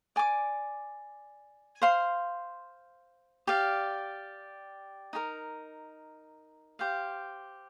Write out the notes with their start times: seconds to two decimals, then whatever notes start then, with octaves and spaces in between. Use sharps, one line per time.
0.16 D5 G#5 D6
1.82 C5 F5 C6
3.47 G4 D5 F5
5.13 D#4 G4 A#4
6.79 G4 C5 F5